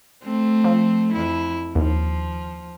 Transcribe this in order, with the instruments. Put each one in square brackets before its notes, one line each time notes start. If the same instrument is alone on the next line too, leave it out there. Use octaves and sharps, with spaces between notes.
[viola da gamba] A3 C4
[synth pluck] F3
[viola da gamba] F2 E4
[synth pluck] D#2 [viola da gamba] F3